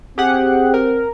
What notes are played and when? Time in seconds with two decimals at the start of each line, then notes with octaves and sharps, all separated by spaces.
0.18 C4 G4 G#4 F#5
0.74 A#4